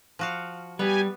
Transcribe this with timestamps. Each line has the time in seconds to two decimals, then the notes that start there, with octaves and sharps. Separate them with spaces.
0.19 F3 F#4 F5
0.79 G3 B3 G4 G#5